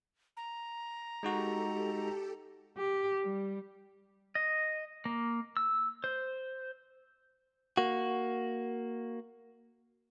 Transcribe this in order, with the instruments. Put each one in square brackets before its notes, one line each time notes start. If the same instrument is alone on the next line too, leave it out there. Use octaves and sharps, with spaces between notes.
[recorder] A#5
[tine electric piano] G#3 D#4 F#4 [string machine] G4 A4
[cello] G4
G3
[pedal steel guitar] D#5
A#3
E6
C5
[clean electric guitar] A#3 F#4